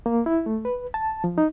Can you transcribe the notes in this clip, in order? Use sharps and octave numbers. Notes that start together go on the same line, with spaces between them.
A#3
E4
A3
B4
A5
F3
D#4